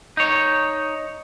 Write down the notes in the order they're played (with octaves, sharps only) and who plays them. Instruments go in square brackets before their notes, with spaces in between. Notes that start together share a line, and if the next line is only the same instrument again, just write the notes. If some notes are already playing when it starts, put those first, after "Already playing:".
[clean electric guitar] D#4 C#5